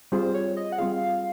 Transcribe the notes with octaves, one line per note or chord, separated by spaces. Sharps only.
G3 C4 F4 G#4 C5
C#5
D#5
F#5
G3 C4 F4 G#4 F5